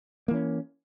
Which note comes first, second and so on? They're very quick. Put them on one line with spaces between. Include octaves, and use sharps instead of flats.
A#3 E3 C#4